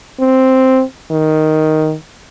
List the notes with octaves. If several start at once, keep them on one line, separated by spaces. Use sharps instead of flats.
C4
D#3